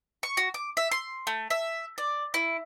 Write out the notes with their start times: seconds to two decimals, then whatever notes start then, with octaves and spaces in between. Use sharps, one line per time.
0.23 C#6
0.37 F#4
0.54 D6
0.77 E5
0.91 C6
1.27 A3
1.50 E5
1.98 D5
2.34 E4